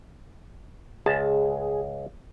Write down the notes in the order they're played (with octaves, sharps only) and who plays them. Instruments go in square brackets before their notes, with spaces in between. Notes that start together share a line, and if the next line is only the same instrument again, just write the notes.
[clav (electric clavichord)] C#2 A5 [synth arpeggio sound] G#4